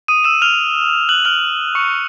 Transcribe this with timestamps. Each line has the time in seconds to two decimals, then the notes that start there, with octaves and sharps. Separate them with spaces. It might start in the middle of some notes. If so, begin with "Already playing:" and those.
0.08 D#6 D#7
0.24 E6 E7
0.42 F6 F7
1.09 F#6 F#7
1.25 F6 F7
1.75 C#6 C#7